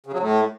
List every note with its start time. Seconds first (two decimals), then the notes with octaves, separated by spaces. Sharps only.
0.06 C#3
0.13 F#3
0.19 A2